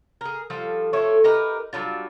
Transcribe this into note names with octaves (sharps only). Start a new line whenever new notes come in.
G#4 A#4
F3 G3 F4 A4
F3 A3 C#5
D#4 G4 A#4 B4
F#3 G3 D4 F4